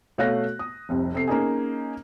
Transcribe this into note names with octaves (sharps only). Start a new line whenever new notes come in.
B2 A3 C#5 F5 F#6 A#6
D#6
F1 C2 F2
C3 A4 C7
A#3 C#4 D#4 G#4